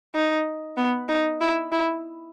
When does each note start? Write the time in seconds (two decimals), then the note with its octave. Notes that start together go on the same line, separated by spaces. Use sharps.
0.15 D#4
0.77 B3
1.09 D#4
1.41 E4
1.72 E4